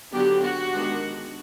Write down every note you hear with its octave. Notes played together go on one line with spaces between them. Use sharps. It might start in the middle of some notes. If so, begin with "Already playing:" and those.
D3 F#3 B3 D4 G4
F#4
D#3 G#3 B3 D4